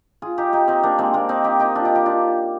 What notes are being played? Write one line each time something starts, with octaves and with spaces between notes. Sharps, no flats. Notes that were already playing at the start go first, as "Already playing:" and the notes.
F4 G#4
D#4 G4
D#4 G4
C4 D#4
A#3 D4
G#3 C4
A#3 D4
C4 D#4
D#4 G4
D#4 G4
D4 F4
D#4 G4
D#4 G4
D4 F4